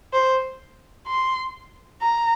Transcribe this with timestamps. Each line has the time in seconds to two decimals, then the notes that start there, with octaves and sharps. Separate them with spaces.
0.13 C5
1.07 C6
2.02 A#5